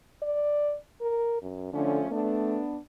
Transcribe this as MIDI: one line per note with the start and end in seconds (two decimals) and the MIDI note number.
0.22 0.76 74
1.01 1.41 70
1.42 1.68 42
1.73 2.00 50
1.73 2.10 53
1.73 2.10 57
1.73 2.10 61
2.11 2.61 57
2.11 2.77 59
2.11 2.77 62